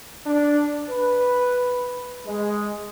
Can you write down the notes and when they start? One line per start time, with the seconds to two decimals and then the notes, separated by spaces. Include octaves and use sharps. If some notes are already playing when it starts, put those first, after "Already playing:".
0.27 D4
0.90 B4
2.26 G#3